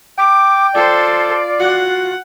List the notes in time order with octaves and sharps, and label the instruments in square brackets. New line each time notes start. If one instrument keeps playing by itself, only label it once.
[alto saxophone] G5 [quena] D6
[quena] F4 [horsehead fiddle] A4 C5 [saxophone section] D5
[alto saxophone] F#4 [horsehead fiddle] F#5